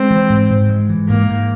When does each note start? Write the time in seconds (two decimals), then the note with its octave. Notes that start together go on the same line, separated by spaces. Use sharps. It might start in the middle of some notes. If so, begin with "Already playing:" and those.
Already playing: G#3 C4
0.11 E3
0.30 G#2
0.50 G#2
0.69 G#3
0.89 E3
1.09 G#2 A#3
1.29 G#2